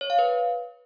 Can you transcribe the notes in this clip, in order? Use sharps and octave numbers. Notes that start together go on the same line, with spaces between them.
C#5
F5
B4